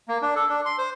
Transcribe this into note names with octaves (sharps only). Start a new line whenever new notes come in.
A#3
D4
A4
D4
C6
C5